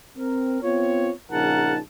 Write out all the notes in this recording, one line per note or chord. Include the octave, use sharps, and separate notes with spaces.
C4 A#4
B3 C4 F4 C#5
A#1 C#3 D#4 A#4 F#5 A5